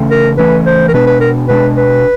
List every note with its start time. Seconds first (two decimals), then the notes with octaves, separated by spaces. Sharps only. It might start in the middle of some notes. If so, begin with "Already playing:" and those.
Already playing: C#3 E3 A3 C#4
0.11 A#4
0.38 C#3 E3 A3 C#4 B4
0.66 C5
0.88 A#4
0.93 B2 G#3 B3 D4 B4
1.07 B4
1.21 A#4
1.48 B2 G#3 B3 D4 B4
1.77 B4